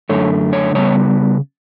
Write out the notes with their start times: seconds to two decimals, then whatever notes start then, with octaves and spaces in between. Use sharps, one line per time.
0.09 F#2 D3 A3 C#5
0.53 C#5
0.75 C#3 G3 B3 C#5